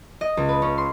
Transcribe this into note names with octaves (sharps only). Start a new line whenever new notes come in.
D#5
C#2
B4
C#4
C6